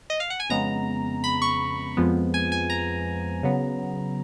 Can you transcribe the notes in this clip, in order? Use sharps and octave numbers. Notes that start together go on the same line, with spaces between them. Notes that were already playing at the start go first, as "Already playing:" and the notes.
D#5
F5
F#5
G#5
F2 C#3 G#3 B3 A#5
B5
C#6
F2 F3 G#3 B3
G#5
G#5
A#5
C#3 F#3 B3